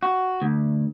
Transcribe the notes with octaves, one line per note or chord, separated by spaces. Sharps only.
F#4
D2